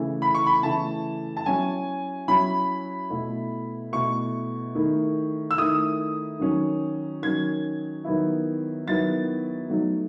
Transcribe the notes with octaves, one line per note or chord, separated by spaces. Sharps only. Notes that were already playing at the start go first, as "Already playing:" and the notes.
Already playing: C#3 E3 A3 E4
B5
C#6
B5
C#3 E3 A3 E4 A5
A5
F#3 C#4 E4 G#5
F#3 C#4 E4 B5
B2 A3 E4
B2 A3 E4 C#6
D#3 A3 E4
E6
D#3 A3 E4 D#6
D#3 F#3 C#4
D#3 F#3 C#4 G#6
D#3 F#3 B3 E4
D#3 F#3 B3 E4 A6
F#3 A3 D#4